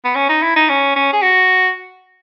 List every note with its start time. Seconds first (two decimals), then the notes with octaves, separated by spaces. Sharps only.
0.04 B3
0.15 C#4
0.29 D#4
0.43 E4
0.56 D#4
0.69 C#4
0.96 C#4
1.13 G#4
1.22 F#4